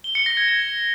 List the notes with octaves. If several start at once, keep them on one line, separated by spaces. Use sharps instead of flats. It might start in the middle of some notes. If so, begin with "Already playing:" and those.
G7
C#7
A#6
G#6
G#6